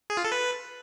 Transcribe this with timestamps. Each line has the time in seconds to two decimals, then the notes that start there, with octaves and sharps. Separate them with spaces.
0.10 G#4
0.17 F4
0.24 A4
0.32 B4